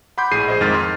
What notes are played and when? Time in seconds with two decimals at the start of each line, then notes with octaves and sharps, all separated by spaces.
0.18 F#5 B5 C6 D6 G6
0.31 A#1 A2 G#4 C7 D#7
0.48 G#4 C5 D#5
0.61 F2 G#2 D#3 G#3 F6 A6
0.74 C6